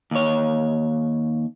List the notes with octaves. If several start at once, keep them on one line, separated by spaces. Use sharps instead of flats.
D#2 C#5